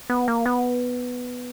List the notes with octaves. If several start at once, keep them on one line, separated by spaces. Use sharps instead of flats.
B3
A#3
B3